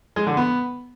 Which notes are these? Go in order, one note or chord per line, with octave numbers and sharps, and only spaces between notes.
G#3
D3
B3